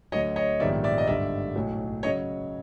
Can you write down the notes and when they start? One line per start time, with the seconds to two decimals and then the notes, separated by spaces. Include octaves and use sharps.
0.12 D2 D3 F#3 C#5 D#5
0.36 C#5 D#5
0.60 A#1 G#2 D#3 G3 B3 D5 E5
0.84 D5 E5
0.98 D#5
1.07 G#1 G2 D3 D5 E5
1.55 B1 A2 F#3
2.03 C#3 F#3 C#5 D#5